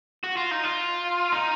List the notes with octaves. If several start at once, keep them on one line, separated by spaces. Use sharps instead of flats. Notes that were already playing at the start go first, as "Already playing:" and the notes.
F#4
F4
D#4
F4
D#4